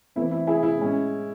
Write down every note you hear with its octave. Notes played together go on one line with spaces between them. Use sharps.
E3 A3 C4 E4
E4
E4 G#4
E4
A2 G#3 C#4